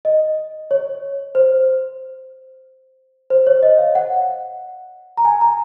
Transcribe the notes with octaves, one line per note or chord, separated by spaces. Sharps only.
D#5
C#5
C5
C5
C#5
D#5
F5
F#5
A#5
G#5
A#5